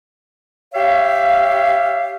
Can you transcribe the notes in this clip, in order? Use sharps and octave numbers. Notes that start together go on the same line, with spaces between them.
G4 C#5 E5 F5